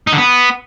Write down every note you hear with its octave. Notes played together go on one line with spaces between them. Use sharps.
D#4
D3
B3